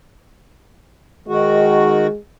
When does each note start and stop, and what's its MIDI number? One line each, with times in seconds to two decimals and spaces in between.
1.28 2.07 51
1.28 2.16 56
1.28 2.07 66